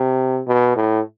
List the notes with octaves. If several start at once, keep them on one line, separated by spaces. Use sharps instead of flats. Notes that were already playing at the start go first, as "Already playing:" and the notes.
Already playing: C3
B2
A2